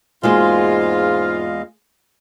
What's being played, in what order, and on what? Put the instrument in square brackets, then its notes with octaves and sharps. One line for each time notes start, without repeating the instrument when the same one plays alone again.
[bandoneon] E2 D#5 F5 [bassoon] G#2 [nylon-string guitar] G#3 A#3 F#4 [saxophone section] F4